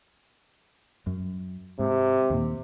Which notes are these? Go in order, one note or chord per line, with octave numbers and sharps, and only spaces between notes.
F#2
G#2 C3
D#2 A#2